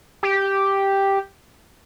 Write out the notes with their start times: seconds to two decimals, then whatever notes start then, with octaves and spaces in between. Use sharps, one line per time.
0.23 G4